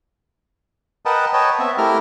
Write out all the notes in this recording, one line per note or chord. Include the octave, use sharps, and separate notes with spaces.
A#4 B4 D#5 F#5 G5 A5
B4 C#5 D#5 G5 A5
B3 C4 E5
A3 E4 G4 A#4 A#5 F6